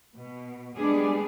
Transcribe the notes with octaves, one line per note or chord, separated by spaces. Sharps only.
B2
G3 G#3 B3 D4 G#4